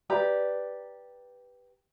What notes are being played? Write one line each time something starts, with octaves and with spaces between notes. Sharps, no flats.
G4 B4 D5 A#5